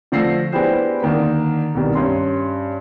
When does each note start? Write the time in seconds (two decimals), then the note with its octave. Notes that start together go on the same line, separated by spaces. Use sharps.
0.12 D3 F3 A3 E6 A#6 C7
0.52 B3 D4 E4 G4 G#4 C5
1.03 D3 D#3 A#3
1.75 C2 B2 D#3 G3
1.95 G2 C#4 C6